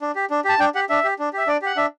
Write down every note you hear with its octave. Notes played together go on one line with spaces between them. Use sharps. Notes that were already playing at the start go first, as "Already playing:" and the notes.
D4
G4
D4
G4 A5
D4 G5
G4 F#5
D4 E5
G4
D4
G4 E5
D4 D5
G4 F#5
D4 E5